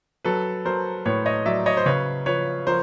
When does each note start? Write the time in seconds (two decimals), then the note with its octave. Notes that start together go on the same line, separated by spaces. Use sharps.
0.25 F#3 A4 B4
0.65 F#3 A#4 C5
1.05 A2 B4 C#5
1.26 C#5 D#5
1.46 F#3 D5 E5
1.66 C#5 D#5
1.77 C5
1.86 C#3 B4 C#5
2.26 F3 B4 C#5
2.66 F3 A#4 C5